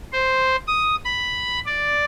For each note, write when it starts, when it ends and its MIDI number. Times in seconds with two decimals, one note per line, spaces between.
0.13 0.56 72
0.67 0.95 87
1.05 1.60 83
1.66 2.05 74